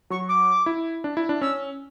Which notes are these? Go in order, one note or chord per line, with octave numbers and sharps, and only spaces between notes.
F#3 C#6
D6
E4
D4
E4
D4
C#4 E6